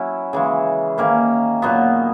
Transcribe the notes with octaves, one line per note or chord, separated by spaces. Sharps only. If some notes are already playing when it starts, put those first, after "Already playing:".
Already playing: F#3 C#4 E4
C#3 E3 G#3
D#3 A#3 C#4
A#2 F#3 B3 F#4